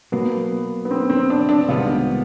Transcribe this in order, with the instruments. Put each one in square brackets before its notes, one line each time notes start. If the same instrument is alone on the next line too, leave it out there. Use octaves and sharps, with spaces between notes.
[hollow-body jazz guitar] B2 F#3 A#3 [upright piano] B3
[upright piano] B3
C4
C4
D4
D4
[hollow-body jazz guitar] C2 C3 D#3 G#3 B3 [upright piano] F4